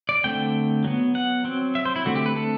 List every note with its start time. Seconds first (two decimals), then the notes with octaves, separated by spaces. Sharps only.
0.09 D5
0.24 D3 A3 C4 G5
0.84 F#3 B3
1.15 F#5
1.45 F#3 C4
1.75 E5
1.85 C5
1.96 E4
2.05 D3 A3 C4 F#4
2.15 G4
2.26 B4
2.36 A4